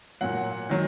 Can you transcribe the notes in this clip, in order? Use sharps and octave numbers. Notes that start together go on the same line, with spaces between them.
A#2 F#3 F#5
D#3 F#3